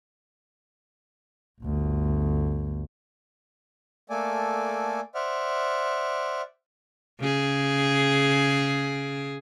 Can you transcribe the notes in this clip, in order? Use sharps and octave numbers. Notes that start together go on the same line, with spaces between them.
G1 D2
A3 A#3 A4 D5 G#5
C5 D5 E5 F#5 F6
C#3 G#4